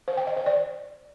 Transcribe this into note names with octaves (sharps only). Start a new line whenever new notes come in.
C5
G5
D#5
C5
D5